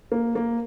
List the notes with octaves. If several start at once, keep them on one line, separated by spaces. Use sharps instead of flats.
A#3
A#3